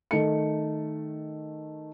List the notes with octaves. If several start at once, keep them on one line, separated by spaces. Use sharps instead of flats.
D#3 A3 C#7